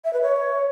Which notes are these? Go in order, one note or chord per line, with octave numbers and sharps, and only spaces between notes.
E5
B4
C#5